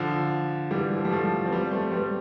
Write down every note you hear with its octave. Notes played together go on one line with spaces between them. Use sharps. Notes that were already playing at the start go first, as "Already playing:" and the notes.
Already playing: D3 F3
E3 G3
F3
G3
F3 A3
C4
G3 B3
A3 C4
G3 B3